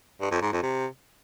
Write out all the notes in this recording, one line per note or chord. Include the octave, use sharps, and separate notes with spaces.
G2
F2
G#2
F2
C3